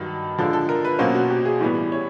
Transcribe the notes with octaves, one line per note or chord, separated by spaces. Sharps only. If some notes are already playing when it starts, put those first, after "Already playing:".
Already playing: G2 D#3 F#3
D3 F3 G#3 A4
A4
A#4
B4
B2 F#3 A#3 C#4 C5
F#4
G4
G#4
A2 E3 G3 B3
C#5